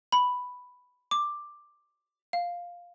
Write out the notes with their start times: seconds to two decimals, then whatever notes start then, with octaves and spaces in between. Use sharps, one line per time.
0.12 B5
1.11 D6
2.33 F5